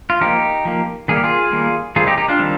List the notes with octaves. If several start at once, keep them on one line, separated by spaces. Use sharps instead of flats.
F4
F3 A#3 D#4 G4
F3 A#3
D#3 G3 A#3 G#4
G4
F4 G#4
D#3 G3 A#3
D#3 G3 C4 F4 G#4
D#4 G4
D#4 G4
D4 F4
D#3 G3 C4